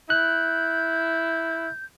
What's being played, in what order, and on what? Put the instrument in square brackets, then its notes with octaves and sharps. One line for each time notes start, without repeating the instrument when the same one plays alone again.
[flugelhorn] E4 [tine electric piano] F#6 [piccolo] G6